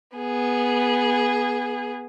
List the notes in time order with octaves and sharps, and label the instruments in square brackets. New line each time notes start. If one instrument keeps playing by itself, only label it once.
[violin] B3 G#4